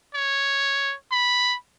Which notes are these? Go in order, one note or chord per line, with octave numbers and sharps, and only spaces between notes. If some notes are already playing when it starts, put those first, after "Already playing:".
C#5
B5